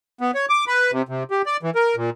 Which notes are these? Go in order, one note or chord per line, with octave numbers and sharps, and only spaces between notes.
B3
C#5
D6
B4
C3
C3
G4
D5
E3
A#4
A#2